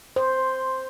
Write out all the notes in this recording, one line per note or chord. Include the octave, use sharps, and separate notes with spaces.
C5